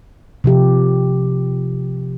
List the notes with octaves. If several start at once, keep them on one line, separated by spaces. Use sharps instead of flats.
C3 F3 G4